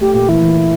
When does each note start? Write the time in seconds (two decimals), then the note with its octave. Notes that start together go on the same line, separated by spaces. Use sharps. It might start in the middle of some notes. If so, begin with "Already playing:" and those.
0.01 A3 G4
0.14 A#2 A#3 G4
0.29 E3 E4
0.42 E3
0.57 E3